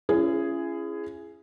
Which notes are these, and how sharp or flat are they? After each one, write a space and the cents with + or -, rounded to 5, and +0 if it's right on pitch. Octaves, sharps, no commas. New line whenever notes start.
C#4 +0 E4 +40 G#4 +0